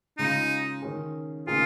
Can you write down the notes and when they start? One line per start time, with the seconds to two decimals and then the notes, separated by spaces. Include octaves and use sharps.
0.18 C#3 G#3 D#4 F4
0.82 D#3 C#4 G#4
1.47 C#3 A#3 D#4 F4 G#4